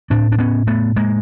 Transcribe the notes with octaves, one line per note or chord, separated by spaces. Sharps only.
A2 C4 D4
D4
B3 C#4
A3 B3
G#3 A#3